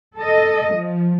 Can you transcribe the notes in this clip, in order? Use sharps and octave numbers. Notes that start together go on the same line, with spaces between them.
A4 D#5
F3